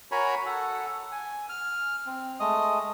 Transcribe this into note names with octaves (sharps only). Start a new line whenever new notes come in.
F#4 A#4 C#5 G#5 A#5 B5
A4 F#5
G#5
F6
C4
G#3 A3 D#5 D#6